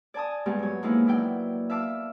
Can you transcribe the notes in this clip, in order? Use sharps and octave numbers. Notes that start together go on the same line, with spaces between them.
D5 G#5 A5 D#6
G2 G3 G#3 B3 G4
F#3 C#5
F3 G#3 A#3 B3 D#4 E4
F#3 E4 D5 G5
E5 F5 A5 D6 E6